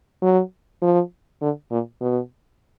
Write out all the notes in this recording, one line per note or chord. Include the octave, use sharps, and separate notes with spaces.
F#3
F3
D3
A#2
B2